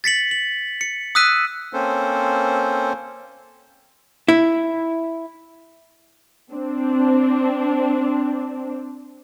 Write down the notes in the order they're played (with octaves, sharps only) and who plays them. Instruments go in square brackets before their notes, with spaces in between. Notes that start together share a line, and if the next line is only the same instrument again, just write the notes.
[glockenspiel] A6 B6 C#7 F#7
F#7
C#7
D#6 E6 F#6 B6 D#7
[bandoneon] A#3 C4 C#4 A4 C5
[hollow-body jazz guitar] E4
[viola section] C4 D4